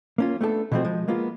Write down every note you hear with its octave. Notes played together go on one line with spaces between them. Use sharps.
A#3 C#4 F4
A3 B3 D4 G4 A4
B2 E3 F3 A3 C4 F#4
F3 G#3
G#3 A#3 B3 F4